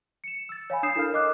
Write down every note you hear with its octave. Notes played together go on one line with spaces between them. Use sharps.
C#7 E7
E6 A6
C#5 F5 G#5 B5
D4 D#6 G6 C7 E7
E4 A4 A#4 F5 F6
A#4 D#5 D6 F#6